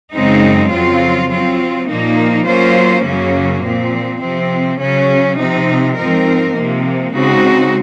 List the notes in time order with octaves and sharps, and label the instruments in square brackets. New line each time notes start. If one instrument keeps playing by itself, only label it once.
[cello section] F#2 C#3 G#3 C4 D#4
F2 C#3 F#3 C4 F4
F#3 C4 F4
A#2 F3 A#3 D#4
F#3 A#3 C#4 F4 C5
F#2 C#3 F#3 A#3 C#4
A#2 F3 C4
C3 F3 C4
C#3 F#3 C#4
C3 F3 C4 D#4
G#2 F3 C4 D#4 A#4
C3 F3 A#3
C#3 G#3 C4 D#4 F#4